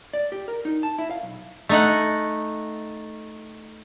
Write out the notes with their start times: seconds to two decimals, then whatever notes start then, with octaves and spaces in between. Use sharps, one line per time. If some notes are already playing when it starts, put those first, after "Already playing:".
0.13 D5
0.32 G4
0.48 A#4
0.65 D#4
0.83 A5
0.98 E4
1.11 F5
1.23 B1
1.69 A3 D#4 F#5